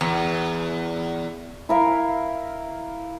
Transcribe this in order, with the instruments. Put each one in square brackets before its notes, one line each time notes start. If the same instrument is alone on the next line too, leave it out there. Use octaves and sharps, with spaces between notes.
[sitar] E2
[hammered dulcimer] E4 A#4 F5